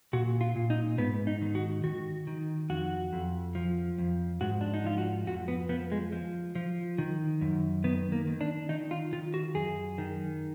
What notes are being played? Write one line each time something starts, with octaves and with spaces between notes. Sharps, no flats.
A#2 F#4
F4
A#2
D#4
G#2 B3
D#4
D#3
F#4
D#3 F#4
D#3
F2 F#4
F2
F3
F2
G#2 F#4
D4
D#4
F3 F4
F#4
F2 F#4
B3
F3 B3
G#3
F3
F3
D#3
F#2
D#3 B3
A#3
D#3
D4
D#3 D#4
F4
D#3 F4
F#4
F#2 G#4
D#3